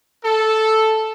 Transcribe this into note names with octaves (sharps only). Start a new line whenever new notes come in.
A4